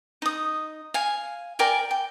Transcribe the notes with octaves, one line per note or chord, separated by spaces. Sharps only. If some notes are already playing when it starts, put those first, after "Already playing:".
D#4 D#6
F5 G#5
A#4 D5 G5 G#5
G5